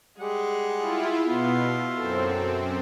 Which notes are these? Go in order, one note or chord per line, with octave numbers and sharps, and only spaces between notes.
G3 G#3 G#4 F#5
E4 F4
B2 B3 E4 F4
F#2 C4 A4